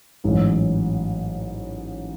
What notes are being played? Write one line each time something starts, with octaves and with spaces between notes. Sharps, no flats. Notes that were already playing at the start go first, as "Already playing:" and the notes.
A1 G#2 F#3